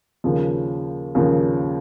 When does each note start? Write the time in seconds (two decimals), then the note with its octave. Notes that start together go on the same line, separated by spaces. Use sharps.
0.24 D#2 C#3 F3
1.15 D#2 C#3 F3